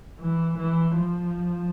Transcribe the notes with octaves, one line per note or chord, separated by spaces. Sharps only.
E3
E3
F3